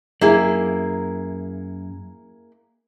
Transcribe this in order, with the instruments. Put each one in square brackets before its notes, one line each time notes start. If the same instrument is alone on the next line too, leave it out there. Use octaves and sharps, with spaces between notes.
[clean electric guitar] F#2 [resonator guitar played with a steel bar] A#3 E4 G#4